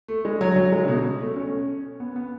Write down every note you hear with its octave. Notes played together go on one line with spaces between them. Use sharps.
A3
G#3
F#3
F#3
G#3
C#3
B2
A3
C#4
B3
B3